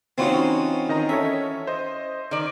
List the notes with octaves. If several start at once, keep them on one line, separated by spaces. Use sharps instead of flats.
E3 C4 C#4 D#4 F4 F#4
D#3 D#5 A#5
C#4 A4 C#5 E5
C5 D#5
D#3 D5